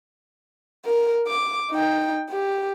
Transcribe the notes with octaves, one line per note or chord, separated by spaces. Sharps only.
A#4
D6
D#4 G5
G4